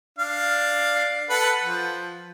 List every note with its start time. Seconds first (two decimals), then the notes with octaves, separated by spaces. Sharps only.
0.19 D4 F5
1.29 A4 B4 F#5
1.63 F3